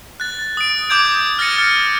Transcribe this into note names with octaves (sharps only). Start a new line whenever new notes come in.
F#6 A6
D#6 D7
D6 D#6 G6 G#6 D7
F6 A6 A#6 C#7 D#7
F6